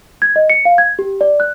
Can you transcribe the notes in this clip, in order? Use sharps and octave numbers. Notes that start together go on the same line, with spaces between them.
G#6
D#5
C#7
F5
G#6
G4
D5
F#6